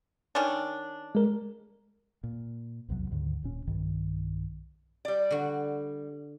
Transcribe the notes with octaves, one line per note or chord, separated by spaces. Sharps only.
D#3 C#4 D4
G#3 A#4
A#2
A#1 E2 C3 F#3
D2 G#2 D3 D#3
D#1 A#2 C#4
B1 G2 D#3
G3 D5
D3 F#4